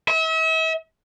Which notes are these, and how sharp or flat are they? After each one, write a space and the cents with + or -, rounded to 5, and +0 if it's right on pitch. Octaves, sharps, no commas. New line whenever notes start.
E5 -40